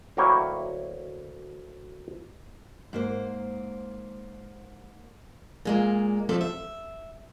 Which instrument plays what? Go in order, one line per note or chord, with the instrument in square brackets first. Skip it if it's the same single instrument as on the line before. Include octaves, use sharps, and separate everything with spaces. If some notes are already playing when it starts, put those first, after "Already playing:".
[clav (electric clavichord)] D2 F#3 A#3 E4 C#5 G5
[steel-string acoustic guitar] G#2 A#3 C5
A#2 G#3 A#3
F3 A3 C4 A4 D5
E5